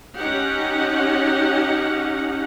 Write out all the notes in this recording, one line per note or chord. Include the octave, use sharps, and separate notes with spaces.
C#4 D#4 G4 F#5